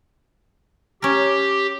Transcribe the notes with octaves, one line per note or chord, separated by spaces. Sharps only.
C#4 G4 A#4